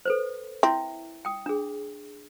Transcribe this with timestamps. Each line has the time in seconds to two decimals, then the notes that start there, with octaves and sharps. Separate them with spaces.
0.05 A4 B4 C5
0.63 C4 E4 E5
1.25 G5 D#6
1.46 D4 G#4